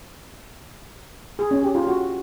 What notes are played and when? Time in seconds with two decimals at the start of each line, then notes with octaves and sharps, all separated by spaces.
1.39 G#4
1.51 C#4
1.63 G4
1.75 F4
1.87 F#4